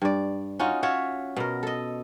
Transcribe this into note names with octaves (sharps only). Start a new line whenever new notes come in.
G2 D5
C#4 D#4 F4 F#4
F4 F#4 C#5 E5
B2 A#4
A4 D#5